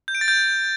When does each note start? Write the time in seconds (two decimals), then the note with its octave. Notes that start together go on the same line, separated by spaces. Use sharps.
0.08 G6
0.15 D7
0.21 A6
0.28 G6